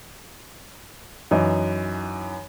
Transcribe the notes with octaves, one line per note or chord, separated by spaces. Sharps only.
F#2 E3 D#4